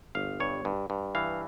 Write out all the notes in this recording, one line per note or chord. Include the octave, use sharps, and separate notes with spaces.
G1 F5
G2 C#5
G2
G2
E3 F5